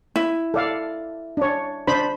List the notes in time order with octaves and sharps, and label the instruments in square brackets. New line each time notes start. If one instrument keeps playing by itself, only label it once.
[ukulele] E4
[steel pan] A4 D5 F5
D4 C#5
D4 C5 B5